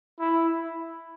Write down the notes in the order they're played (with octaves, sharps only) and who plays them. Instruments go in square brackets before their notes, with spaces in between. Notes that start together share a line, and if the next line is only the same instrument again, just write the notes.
[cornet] E4